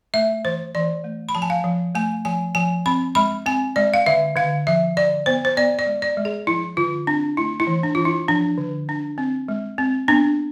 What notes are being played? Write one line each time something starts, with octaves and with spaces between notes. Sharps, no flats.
A3 E5
E3 C5
E3 D5
A3
B5
F3 A5
G#5
F5
F3
A3 G#5
F3 G#5
F3 G#5
C4 B5
G#3 B5
C4 G#5
G#3 D5
F5
D3 E5
D3 F5
F3 E5
D3 D5
B3 C5
C5
B3 D5
D5
G#3
D5
G#3
G#4
F3 E4
D3 F4
C4 D4
A3 E4
E4
E3
D4
E3 F4
E4
F3 D4
D3
D4
C4
G#3
C4
B3 D4